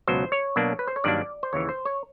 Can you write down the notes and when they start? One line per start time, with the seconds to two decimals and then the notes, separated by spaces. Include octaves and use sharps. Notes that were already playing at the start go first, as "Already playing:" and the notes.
0.07 C#2 B2 F#3 C5
0.32 C#5
0.56 B2 F#3 A#3 D4
0.79 B4
0.87 C5
0.96 C#5
1.04 G2 D#3 F#3 A#3 D4 D5
1.43 C5
1.53 D#2 C#3 E3 C#5
1.69 C5
1.85 C#5